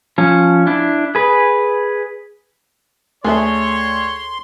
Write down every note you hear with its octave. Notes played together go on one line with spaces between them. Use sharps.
F3 C#4
D4 E4
G#4 B4
D2 G#4 A4 C#5 E5 C6